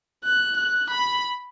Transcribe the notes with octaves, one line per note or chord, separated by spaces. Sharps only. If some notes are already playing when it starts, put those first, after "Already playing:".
F#6
F#6
B5